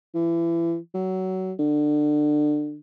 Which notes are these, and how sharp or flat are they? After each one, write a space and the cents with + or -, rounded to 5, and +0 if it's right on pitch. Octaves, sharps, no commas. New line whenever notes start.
E3 +30
F#3 +20
D3 +25